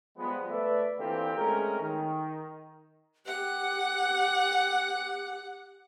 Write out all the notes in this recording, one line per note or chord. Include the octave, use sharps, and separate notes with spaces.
F3 G3 G#3 B3
A3 B4 D5 E5
D3 E3 A#3 C4 F4 G4
G#3 A3 C4 C#4 A#4
D#3
G4 F#5